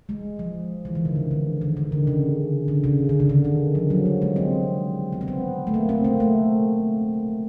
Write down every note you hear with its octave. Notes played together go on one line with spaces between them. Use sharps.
G#3
F3
E3
D#3
D3
C#3
D3
D#3
D#3
D3
C#3
D3
C#3
D3
C#3
D3
D#3
F3
F#3
G3
G#3
C4
B3
C4
B3
A3
A#3
C4
A#3
A3